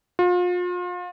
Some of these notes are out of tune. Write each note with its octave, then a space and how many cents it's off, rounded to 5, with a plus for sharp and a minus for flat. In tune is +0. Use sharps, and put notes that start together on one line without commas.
F4 +35